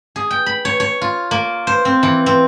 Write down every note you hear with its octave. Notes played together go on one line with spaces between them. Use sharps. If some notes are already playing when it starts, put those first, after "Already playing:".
G#4
G5
B5
C#5
C#5
F4
A#3
C5
C4
E3
C4